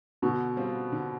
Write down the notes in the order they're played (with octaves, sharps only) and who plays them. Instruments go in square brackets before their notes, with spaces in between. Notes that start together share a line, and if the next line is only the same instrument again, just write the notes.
[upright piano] B2 [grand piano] D3
[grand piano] G3 C4 F4
D3